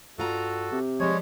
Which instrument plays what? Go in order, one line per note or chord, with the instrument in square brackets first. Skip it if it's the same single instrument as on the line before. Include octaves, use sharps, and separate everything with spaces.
[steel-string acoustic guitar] G2 F4 A#5 [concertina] F#4 A4
[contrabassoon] C3
[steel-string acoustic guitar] F3 G3 [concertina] G#3 C#5